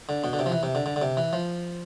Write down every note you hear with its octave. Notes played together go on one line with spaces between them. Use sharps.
D3
B2
D3
C3
F3
E3
C3
D3
D3
D3
C3
E3
F3